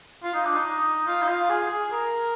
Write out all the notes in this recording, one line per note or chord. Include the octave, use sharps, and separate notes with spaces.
F4
D#4
D4
D#4
F4
D#4
F4
G#4
G#4
A#4